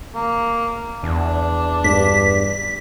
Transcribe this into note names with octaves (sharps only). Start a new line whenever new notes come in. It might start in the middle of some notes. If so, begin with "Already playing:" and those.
A#3
E2 D4
G2 B6